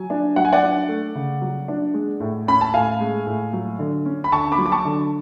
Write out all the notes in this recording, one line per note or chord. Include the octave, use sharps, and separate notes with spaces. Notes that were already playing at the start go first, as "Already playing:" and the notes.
Already playing: F#3 G#5
D4
F#3 F#5
G#5
D5 F#5
D4
A3
C#3
F#3
D4
G#3
A2
C#4 B5
A5
A2 F5 G#5
G#3
A2
F#3
D3
C#4
B5
D3 A5 C#6
B5 D6
F#3
D6
A5 C#6
D3